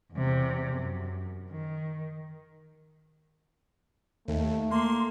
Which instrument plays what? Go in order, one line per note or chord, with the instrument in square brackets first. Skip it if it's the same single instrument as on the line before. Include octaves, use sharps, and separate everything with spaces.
[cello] E2 C3
F#2
D#3
[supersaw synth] D#2 [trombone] A3
[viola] A#3 [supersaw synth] C6